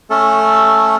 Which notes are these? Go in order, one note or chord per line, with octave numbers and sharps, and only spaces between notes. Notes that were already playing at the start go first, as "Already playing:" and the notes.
A3 C#4 A4